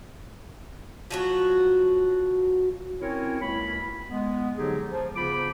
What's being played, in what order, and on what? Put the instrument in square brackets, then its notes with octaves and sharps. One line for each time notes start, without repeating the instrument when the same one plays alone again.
[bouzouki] F3 F#3 F#4
[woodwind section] C4 C#4 E4 F#4 A#4 C#5
C#2 A#3 E4 B5
G#3 B3
D3 F3 F#3 D#4 G4 G#4
F3
C#3 B3 F4 C5 B5 D6